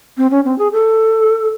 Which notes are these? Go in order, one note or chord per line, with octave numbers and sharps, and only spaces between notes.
C4
C#4
C4
G#4
A4